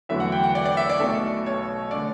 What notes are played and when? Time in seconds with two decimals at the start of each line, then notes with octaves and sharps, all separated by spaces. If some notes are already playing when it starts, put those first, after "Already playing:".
0.09 E2 D3 F#3 A3 E5
0.20 F#5
0.32 G5
0.44 F#5
0.55 D5
0.66 D5
0.77 E5
0.89 D5
1.00 B1 B2 A3 A4
1.46 C#5
1.91 D3 A3 D5